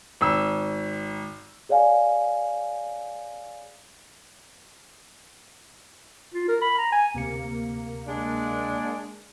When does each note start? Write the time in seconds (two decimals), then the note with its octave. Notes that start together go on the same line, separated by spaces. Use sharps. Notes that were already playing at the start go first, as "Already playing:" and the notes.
0.21 G#1 E6
1.69 G#4 C#5 D5 F5 G#5
6.34 F4
6.48 A#4
6.62 B5
6.78 A#5
6.92 G#5
7.14 D2 C3 A#3 C#7
8.08 G#3 D4